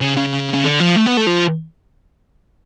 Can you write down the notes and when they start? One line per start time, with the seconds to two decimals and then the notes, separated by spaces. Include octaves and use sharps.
0.01 C#3
0.17 C#3
0.53 C#3
0.64 D3
0.80 F3
0.96 A3
1.06 B3
1.17 A3
1.27 F3